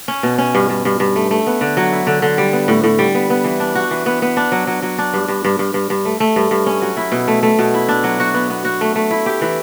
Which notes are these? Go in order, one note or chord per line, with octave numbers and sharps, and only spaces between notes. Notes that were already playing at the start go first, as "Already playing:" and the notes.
C#4
B2
C#4
G2
G2
G2
G2
A3
A3
B3
D3
F#3
E4
D3
D3
G3
B3
A2
A2
G3
B3
B3
E3
D4
F#4
E3
B3
B3
D4
F#3
F#3
F#3
D4
G2
G2
G2
G2
G2
G2
A3
A3
G2
G2
C#4
F#3
E4
B2
A3
A3
B2
E4
D4
F#3
F#4
B3
B3
F#4
A3
A3
E4
G4
E3